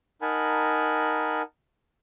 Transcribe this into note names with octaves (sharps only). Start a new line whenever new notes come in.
D#4 A#4 F#5 G#5 A5 B5